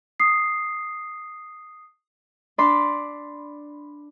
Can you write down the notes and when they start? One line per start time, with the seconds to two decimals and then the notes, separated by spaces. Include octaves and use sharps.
0.20 D#6 C7
2.58 D4 D5 B5 C6